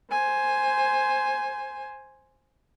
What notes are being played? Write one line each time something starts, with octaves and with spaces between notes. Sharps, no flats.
C5 G#5